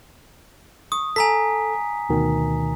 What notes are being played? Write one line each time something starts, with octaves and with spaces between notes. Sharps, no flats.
C#6 D#6
A4 G#5 A#5 B6
D2 B2 D#3